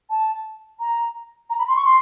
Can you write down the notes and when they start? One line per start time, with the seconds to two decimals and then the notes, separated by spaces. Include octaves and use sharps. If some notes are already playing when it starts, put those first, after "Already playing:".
0.10 A5
0.80 A#5
1.49 A#5
1.58 B5
1.68 C6
1.76 C#6
1.84 C6